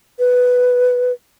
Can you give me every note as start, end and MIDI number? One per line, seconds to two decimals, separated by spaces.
0.19 1.12 71